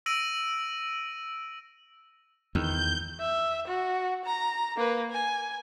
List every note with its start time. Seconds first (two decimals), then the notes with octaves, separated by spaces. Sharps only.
0.06 E6 A#6 D7 D#7 F#7
2.55 E2 D#3 G6
3.20 E5
3.67 F#4
4.25 A#5
4.77 A#3 B4
5.11 G#5